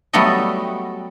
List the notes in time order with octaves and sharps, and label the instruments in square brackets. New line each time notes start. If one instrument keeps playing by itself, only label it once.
[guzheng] F#3 G3 A3 B3 A4 D#5